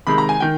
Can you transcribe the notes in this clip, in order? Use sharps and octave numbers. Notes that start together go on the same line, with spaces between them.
C3 D#3 G#3 B5
A#5
G#5
D#3 G5